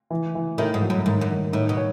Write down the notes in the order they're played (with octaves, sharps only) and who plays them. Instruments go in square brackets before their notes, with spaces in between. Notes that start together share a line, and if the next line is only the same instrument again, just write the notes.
[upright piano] E3
E3
[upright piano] A2 [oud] D#3
[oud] G#2
[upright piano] F#3
[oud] F#2
[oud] G#2 [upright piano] D#3
[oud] F#2
[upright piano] D#3
[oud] A2 [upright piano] D#4
[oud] B2
[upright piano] C#5